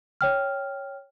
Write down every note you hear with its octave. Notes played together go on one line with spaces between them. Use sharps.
C#5 G5 F6